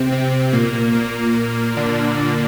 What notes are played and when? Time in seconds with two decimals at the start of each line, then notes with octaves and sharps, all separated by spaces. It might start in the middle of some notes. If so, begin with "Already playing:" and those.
Already playing: C3 C4
0.12 C3 C4
0.53 A#2 A#3
0.95 A#2 A#3
1.77 D3 D4